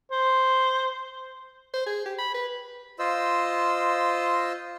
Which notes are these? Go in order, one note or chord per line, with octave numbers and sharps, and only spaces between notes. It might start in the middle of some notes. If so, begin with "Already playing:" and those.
C5
C5
G#4
G4
B5
B4
F4 C5 D#5 E6